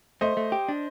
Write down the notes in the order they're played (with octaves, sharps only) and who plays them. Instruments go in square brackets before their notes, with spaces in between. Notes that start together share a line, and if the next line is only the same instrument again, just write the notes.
[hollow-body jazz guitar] A3 [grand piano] C5 D#5
[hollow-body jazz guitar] A3
G4
D4